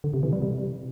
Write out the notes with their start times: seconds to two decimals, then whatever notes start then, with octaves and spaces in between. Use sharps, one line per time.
0.04 D3
0.14 C3
0.23 E3
0.33 G3
0.42 C3